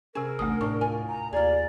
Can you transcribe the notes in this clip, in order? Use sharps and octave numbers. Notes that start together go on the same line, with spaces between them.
C3 C#4 G#4 A#4
A1 D2 A3 D#6
A2 D4 C#6
F4 G#5
A#5
D#2 F4 G#4 D5